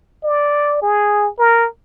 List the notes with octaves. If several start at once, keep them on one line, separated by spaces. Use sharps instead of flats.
D5
G#4
A#4